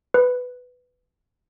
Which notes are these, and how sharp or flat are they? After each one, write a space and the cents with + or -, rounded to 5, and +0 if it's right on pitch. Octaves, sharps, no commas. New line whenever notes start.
B4 +10